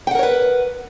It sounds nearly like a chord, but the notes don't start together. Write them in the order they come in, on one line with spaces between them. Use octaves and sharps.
G5 F#5 A#4 C#5 B4